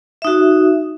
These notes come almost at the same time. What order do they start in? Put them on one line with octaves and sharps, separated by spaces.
E5 D#4 F#4